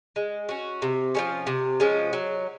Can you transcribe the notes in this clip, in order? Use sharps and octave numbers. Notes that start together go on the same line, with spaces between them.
G#3
C#4 F#4
C3
F3 G#3 C#4
C3
F3 G#3 C#4
F#3